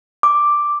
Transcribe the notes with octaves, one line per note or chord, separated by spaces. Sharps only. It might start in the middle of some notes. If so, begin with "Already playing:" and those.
D6